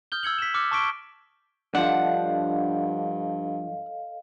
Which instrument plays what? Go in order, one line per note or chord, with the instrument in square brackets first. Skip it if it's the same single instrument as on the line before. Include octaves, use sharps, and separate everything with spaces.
[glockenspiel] D#6 F6 G6 G7
E6 G#6 C#7 F#7
B6 E7
D6 E6 F6 A6 C#7
A5 C#6 D6 B6 D7 G7
[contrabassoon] G2 [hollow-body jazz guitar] F3 D4 [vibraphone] A4 D#5 F5 [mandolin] F#5